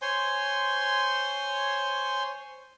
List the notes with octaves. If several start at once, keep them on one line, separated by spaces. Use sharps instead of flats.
C5 C#5 G#5 C6